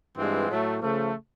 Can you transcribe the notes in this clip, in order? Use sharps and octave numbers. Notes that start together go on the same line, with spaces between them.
G2 E3 G#3 C4 F4
A2 F#3 A3
C#3 F3 A3